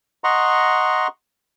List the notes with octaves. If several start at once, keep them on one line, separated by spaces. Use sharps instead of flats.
D#5 F#5 A#5 C6 C#6